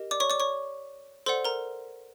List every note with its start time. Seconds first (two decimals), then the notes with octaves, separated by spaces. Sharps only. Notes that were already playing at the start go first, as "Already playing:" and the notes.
Already playing: G4 A#4 D#5
0.11 D5 D6
0.20 C#5 C#6
0.30 D5 D6
0.40 C#5 C#6
1.26 A4 C5 D5 F#5 C6
1.45 A#4 A#5